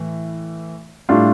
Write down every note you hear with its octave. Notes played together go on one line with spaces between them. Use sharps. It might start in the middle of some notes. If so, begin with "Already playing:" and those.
Already playing: A2 E3
A2 G3 D4 F4